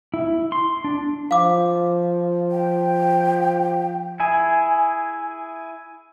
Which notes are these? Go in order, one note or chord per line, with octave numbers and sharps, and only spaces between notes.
E4
C6
D4
F3 F5 D6
G5
E4 G#4 G#5